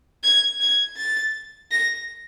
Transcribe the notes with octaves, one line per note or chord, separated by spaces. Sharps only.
G#6
G#6
A6
A#6